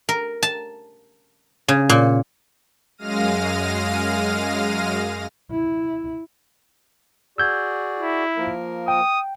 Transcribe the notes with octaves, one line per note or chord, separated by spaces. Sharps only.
A#4
A5
C#3
A#2
F#2 G#3 F5 F6 A#6 D#7
E4
F#4 G#4 D5 E6 G6 G#6
E4
F3 A#3 A#4
G5 D#6